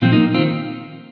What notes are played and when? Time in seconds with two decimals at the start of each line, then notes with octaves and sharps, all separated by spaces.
0.02 A#2 F3 C4 F4
0.12 A#3 D#4
0.34 C4 F4
0.38 D#3